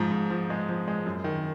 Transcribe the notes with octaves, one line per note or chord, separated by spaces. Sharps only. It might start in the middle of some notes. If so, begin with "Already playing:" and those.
Already playing: G#2 F3
G#2
F3
G#3
F3
G#3
F#2
D#3